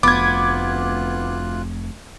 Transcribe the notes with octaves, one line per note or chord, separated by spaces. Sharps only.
F1 D2 B3 F4 D6 F#6 G#6